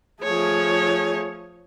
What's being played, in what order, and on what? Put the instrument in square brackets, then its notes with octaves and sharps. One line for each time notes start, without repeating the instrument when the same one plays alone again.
[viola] F3 C#5 [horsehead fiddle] A3 G#4